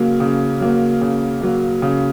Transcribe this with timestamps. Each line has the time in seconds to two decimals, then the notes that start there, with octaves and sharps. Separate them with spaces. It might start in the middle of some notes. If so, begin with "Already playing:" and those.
Already playing: C#3 F#3 A#3
0.20 C#3
0.60 F#3 A#3
1.01 C#3
1.41 F#3 A#3
1.82 C#3